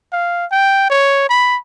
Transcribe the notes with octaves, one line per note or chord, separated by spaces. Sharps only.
F5
G5
C#5
B5